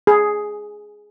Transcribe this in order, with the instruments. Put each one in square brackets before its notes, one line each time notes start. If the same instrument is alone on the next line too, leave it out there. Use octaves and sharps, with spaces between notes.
[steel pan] G#4